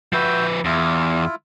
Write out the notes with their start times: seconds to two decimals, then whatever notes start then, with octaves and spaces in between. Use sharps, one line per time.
0.13 F3 F#4 B4 E5 G5
0.65 E2 E4 F4